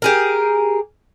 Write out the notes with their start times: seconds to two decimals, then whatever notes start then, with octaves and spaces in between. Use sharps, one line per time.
0.02 G4 G#4 A#4